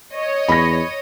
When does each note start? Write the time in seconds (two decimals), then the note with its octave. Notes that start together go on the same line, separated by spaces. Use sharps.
0.14 C#5 D#5
0.49 E2 B5 A#6